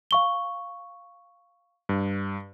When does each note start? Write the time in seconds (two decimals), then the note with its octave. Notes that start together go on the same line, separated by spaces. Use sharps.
0.11 F5 C#6 G7
1.89 G2